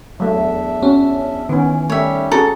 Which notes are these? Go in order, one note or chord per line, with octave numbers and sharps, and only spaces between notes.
E2 F#3 A3 D4 E5
C#4 F#4
D#3 E3 B3 C#4
G3 A3 C#4 G4 C#5 E5
C#4 F#4 G#4 A4 A#5